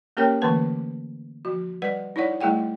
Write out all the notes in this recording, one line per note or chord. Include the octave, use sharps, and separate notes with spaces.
A#3 C#4 G4 A#4 C#5 G5
D3 E3 A3 A#3 B4 A5
F3 F#4
G3 B4 D5 F#5
D#4 E4 C#5 D5 F#5
G3 A3 E4 G#4 F#5 G5